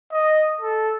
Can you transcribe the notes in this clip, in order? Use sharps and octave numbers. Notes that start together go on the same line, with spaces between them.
D#5
A4